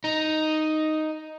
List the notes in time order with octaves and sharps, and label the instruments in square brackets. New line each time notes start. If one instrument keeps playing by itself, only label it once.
[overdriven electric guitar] D#4